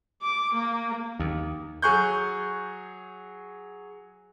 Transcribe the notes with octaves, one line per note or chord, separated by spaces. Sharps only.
D6
A#3
D#2
F#3 G#4 C#6 F#6 G6